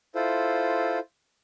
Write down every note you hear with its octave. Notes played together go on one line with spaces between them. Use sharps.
E4 F4 A4 C5